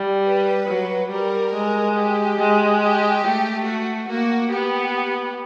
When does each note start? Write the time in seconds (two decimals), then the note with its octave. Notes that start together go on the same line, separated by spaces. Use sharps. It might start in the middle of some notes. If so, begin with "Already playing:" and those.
Already playing: G3
0.25 B4
0.68 F#3
1.10 G3 A#4
1.53 G#3
1.96 G4
2.38 G#3
2.81 G4
3.24 A3
3.66 F#4
4.09 A#3 F#4
4.52 B3 G4